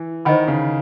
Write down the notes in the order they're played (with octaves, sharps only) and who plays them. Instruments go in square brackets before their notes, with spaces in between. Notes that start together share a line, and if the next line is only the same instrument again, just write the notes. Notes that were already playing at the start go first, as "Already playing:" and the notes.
Already playing: [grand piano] E3
[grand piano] D#3 [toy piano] C5 D#5 F#5 B5
[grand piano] C#3